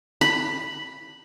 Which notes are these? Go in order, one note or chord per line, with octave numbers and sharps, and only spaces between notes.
B5